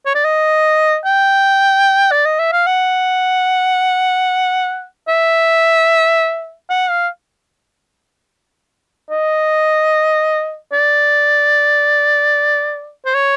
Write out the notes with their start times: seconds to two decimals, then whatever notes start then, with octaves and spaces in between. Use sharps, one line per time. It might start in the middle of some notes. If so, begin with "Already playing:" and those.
0.06 C#5
0.15 D5
0.24 D#5
1.05 G5
2.11 D5
2.25 D#5
2.39 E5
2.52 F5
2.67 F#5
5.08 E5
6.70 F#5
6.90 F5
9.10 D#5
10.73 D5
13.06 C5
13.14 C#5